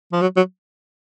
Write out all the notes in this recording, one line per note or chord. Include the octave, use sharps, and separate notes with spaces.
F3
F#3
F#3